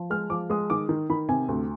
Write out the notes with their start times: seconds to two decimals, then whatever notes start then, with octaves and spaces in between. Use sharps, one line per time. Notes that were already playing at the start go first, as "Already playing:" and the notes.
Already playing: F3
0.10 G#3 F6
0.30 F3 D6
0.50 G#3 D#6
0.70 D#3 D6
0.89 D#3
1.10 D#3 B5
1.29 C3 G#5
1.48 D2